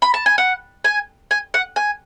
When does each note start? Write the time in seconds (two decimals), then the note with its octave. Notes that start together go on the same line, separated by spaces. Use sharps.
0.02 B5
0.14 A5
0.26 G#5
0.38 F#5
0.84 G#5
1.31 G#5
1.54 F#5
1.76 G#5